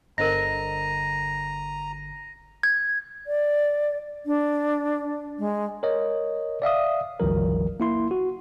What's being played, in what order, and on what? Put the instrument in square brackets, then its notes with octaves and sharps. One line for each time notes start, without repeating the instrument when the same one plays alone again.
[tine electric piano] G1 D3 [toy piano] A#4 C5 D#5 [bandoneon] A#5 [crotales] A#6 D#7
[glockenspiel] G#6
[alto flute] D5
D4
G#3
[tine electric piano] A#4 C#5 D#5
D5 E5 F5 D#6
G1 C#2 E3 F#3 A#4
A#3 E4 C6
F#4